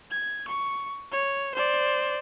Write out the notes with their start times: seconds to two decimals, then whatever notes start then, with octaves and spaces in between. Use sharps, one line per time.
0.11 G#6
0.48 C#6
1.12 C#5
1.54 C5 D5